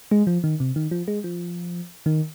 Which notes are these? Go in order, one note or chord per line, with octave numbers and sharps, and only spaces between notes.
G#3
F3
D#3
C3
D#3
F3
G#3
F3
D#3